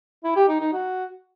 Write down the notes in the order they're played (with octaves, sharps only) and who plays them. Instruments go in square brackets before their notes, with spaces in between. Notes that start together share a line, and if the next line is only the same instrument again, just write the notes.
[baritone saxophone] E4
G4
D#4
D#4
F#4